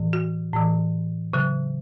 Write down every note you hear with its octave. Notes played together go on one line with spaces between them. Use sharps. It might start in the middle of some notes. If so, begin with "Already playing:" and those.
Already playing: A2 E3
F#4
A2 E3
C#3 F#3